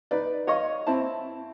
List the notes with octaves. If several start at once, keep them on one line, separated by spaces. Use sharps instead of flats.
D#4 B4 D5
C#5 D#5 F5 C#6
C4 E4 A5